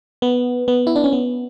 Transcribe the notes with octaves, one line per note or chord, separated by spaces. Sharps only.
B3
B3
E4
D4
C#4
B3